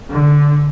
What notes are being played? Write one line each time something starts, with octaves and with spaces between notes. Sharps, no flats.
D3